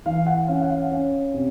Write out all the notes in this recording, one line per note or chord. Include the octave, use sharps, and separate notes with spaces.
E3 F5
F#5
C#4 F5
F#5
F5
C#4
C3